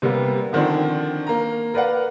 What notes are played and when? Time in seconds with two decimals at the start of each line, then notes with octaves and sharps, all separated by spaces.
0.02 C3 G3 A#3 B3
0.53 D3 D#3 F3 C4 D4
1.27 A#3 A#5
1.74 A#4 B4 D5 F5 F#5